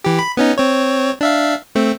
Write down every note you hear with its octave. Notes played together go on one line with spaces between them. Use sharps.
E3 G4
B5
B3 C#4 D#4
C4 C#5
D4 E5 F5
A3 C4